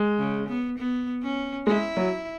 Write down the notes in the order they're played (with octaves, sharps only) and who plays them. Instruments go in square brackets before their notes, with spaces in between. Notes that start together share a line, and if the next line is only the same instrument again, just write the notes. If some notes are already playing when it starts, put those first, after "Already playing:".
Already playing: [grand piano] G#3
[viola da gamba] C#3
B3
B3
C#4
[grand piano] G#3 [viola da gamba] E4
[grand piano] F#3